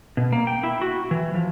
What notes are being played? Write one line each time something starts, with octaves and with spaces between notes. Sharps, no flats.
B2
A#3
G5
E4
F#4
E3
F3